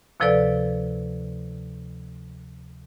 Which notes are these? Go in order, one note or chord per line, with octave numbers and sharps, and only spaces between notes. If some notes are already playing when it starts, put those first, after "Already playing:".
D2 C3 F3 A4 B4 D5